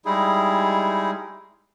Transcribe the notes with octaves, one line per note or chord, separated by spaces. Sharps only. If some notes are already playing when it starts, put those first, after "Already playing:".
G3 G#3 D#4 E4 G#4